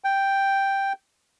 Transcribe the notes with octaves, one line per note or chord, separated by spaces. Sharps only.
G5